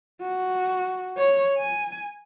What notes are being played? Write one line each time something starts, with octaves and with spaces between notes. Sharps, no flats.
F#4
C#5
G#5